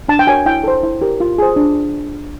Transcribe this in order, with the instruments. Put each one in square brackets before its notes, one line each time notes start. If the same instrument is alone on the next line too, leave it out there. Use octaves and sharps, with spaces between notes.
[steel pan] D4 A5
G5
F#4 A#4 C#5 G#5
E4 G5
A4 C5
E4
G4 A#4
F4
G#4 C5
D4